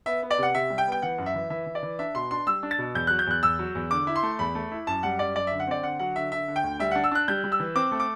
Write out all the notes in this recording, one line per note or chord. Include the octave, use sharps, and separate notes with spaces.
B3 E5
B3
D5
C3 F#5
C3 E5
G3
G5
B3
G5
E3 F#5
F#2
E5
E3
E3 E5
E3
D5
E3
D4 E5
B2 C6
D4 C6
G3 E6
D4
A6
B2
E2 G6
F#3 F#6
G6
E2 F#6
E2 E6
F#3
E2
D3 D6
E4
C6
A3
E2 B5
A3
E4
F#2 A5
G3 F#5
F#2 D5
F#2 D5
D3 E5
F#5
C4 D5
D3 F#5
F#3 F#5
D3 E5
D3 E5
D3
G5
D2
G3 E5
D4 F#5
E6
D4 F#6
G3 G6
G3
E6
E3
C4 D6
A3
D6